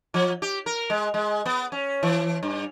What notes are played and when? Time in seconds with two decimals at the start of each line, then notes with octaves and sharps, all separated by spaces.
0.14 F3
0.42 G4
0.66 A#4
0.90 G#3
1.14 G#3
1.46 B3
1.72 C#4
2.03 E3
2.43 G2